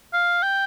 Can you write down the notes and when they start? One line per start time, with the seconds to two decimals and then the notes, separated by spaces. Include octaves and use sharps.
0.13 F5
0.42 G5